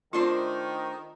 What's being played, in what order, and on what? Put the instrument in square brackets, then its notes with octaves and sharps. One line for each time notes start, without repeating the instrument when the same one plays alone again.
[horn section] D#3 [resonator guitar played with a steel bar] A3 D4 C5 [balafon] F4